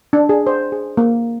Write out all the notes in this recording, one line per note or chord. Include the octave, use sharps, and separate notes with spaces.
D4
G#4
C5
G#4
A#3